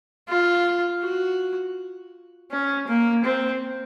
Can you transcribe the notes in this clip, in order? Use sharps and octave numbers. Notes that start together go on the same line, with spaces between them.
F4
F#4
C#4
A#3
C4